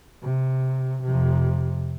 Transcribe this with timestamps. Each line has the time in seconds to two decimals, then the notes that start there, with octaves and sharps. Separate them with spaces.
0.23 C3
1.04 F2 C3